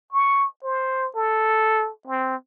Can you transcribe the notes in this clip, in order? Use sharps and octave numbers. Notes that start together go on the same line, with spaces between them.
C#6
C5
A4
C4